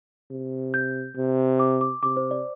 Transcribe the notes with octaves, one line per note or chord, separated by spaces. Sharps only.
C3
G6
C3
D6
D6
C3 D6
C5
D5